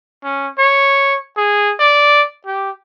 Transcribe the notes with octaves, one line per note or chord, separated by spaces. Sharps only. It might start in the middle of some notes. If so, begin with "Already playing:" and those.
C#4
C#5
G#4
D5
G4